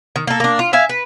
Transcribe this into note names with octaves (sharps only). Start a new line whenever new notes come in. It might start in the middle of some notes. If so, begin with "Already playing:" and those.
D#3
A#3 A4
A#3 D4
F4
E5 F5 G#5
B4